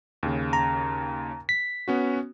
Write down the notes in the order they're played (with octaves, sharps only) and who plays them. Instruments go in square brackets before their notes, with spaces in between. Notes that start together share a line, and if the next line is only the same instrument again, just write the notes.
[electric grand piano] D#2 C#3
[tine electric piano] A#5
B6
[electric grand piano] B3 C#4 F#4